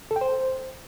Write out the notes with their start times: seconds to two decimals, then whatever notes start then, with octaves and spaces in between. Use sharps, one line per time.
0.11 A4
0.16 G5
0.21 C5